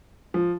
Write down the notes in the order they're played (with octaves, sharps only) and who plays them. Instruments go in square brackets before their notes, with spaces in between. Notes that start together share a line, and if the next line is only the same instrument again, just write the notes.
[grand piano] F3